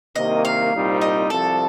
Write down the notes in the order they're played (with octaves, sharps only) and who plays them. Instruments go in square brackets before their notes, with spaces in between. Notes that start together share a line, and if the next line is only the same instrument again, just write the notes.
[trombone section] C2 C3 D#3 A#3 [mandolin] D#5
[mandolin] F5
[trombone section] C2 A#2 G3 C4 D#4
[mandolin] D#5
[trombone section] C2 C3 F3 [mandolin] A4